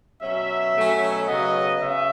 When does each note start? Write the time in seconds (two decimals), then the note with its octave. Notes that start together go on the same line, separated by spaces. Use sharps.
0.22 B2 F#3 C#4 E5
0.76 B2 F#3 A3 C#4
1.28 C#3 F#3 B3 D#5
1.81 C#3 E5